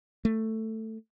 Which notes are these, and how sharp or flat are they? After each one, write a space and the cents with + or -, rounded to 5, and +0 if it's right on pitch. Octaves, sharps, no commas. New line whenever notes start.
A3 +10